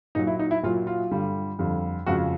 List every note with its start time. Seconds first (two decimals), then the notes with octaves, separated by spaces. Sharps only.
0.15 A#2 F#3 D#4
0.27 E4
0.39 D#4
0.51 E4
0.63 A#2 F#3 F4
0.87 F4
1.11 G2 D3 G3
1.59 F2 D3 G3
2.06 F2 C#3 F3 G#3 F#4